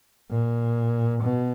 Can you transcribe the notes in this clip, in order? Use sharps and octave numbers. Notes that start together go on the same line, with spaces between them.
A#2
B2